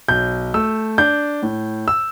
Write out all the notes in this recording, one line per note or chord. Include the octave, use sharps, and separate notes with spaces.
B1 G6
A3 E6
D4 G6
A2
E6